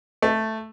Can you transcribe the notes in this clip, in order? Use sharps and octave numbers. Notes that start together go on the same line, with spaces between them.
A3